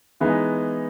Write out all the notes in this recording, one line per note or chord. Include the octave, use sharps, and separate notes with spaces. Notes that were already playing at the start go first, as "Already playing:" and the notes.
E3 G#3 B3 D#4